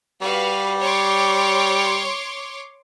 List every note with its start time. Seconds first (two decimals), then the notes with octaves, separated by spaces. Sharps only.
0.22 G3 F#4 B4 F5
0.80 C#5 C6 D6